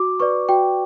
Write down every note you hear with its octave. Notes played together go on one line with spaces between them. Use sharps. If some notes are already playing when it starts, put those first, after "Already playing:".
Already playing: F#4 D6
B4 D5 C#6
F#4 G5